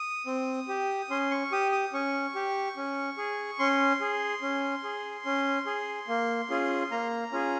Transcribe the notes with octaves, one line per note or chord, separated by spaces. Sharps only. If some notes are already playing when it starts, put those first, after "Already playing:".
Already playing: D#6
C4
G4
C#4 C6
C#6
G4 D#6
D#6
C#4 C#6
G4
C#4
G#4
C#4 C6
G#4
C#4
G#4
C#4
G#4
A#3
C#4 F4 G#4
A#3 A#5
C#4 F4 G#4